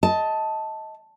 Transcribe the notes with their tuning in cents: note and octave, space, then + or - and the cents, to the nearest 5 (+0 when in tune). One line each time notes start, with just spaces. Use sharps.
D#5 +25 A5 +0